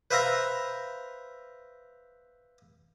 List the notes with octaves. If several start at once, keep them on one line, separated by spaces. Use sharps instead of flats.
B4 C5 E5 F5 A#5